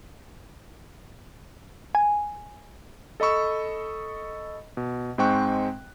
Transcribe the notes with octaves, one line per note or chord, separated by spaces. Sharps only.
G#5
A4 D#5 B5 C#6 E6
B2
G#2 G#3 C4 G5 C#6 F#6